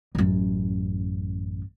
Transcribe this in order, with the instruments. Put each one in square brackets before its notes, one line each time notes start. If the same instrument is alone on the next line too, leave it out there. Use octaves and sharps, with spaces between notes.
[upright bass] A1 F#2